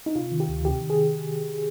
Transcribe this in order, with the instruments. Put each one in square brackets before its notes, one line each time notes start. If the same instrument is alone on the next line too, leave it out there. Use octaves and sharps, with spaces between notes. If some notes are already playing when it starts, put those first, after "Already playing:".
[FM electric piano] D#4
C3 F4
D#3
G4
D2
C3 G4
D#3
G#4